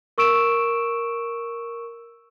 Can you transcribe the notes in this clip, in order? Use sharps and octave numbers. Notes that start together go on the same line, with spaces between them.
A#4 C#6 E6 D7 E7